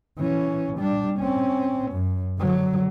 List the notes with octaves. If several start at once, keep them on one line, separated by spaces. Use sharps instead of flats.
E3 C#4
G3 D4
C4 C#4
F#2
D3 F#3